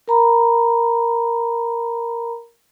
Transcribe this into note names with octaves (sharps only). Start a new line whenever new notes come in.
A#4 A#5 B5